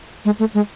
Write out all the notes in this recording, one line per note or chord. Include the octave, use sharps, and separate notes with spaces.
G#3
A3
G#3